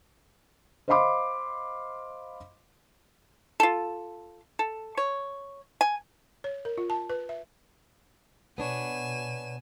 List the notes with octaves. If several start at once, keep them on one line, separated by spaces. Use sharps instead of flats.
C5 D#5 F5 B5 C6 D6
F4 A4
A4
C#5
G#5
C#5
A#4
F4
A5
B4
E5
B2 B3 D4 C#5 G#5 E7